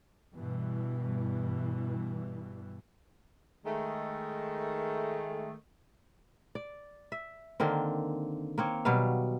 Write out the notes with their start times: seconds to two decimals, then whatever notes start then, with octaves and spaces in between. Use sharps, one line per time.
0.33 G2 B2 E3
3.65 D#3 G#3 A3
6.55 D5
7.12 E5
7.60 D3 D#3 A#3 C4
8.58 A#3 C4 C#5
8.85 B2 F#3 G3 F5